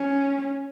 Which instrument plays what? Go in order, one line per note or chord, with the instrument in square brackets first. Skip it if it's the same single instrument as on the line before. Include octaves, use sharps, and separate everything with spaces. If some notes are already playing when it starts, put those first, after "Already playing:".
Already playing: [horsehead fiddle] C#4